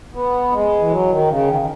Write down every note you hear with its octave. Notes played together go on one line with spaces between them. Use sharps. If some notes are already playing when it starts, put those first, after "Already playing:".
B3
G#3
E3
F#3
D#3
C#3
D#3
D#3